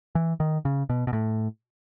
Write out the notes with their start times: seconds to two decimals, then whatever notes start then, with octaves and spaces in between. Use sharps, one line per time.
0.15 E3
0.40 D#3
0.65 C#3
0.90 B2
1.07 B2
1.13 A2